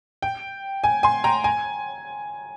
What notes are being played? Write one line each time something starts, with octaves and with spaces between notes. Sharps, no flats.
G5
G#5
G#5 C6
G5 A#5
G#5